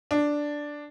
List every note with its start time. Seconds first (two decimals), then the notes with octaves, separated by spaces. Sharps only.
0.11 D4